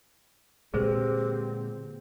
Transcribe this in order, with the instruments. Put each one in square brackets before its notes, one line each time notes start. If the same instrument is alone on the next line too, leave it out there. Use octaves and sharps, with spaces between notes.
[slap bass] A#2 D3 G#3 [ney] C4 [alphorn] G4 [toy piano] G#4 B4 C5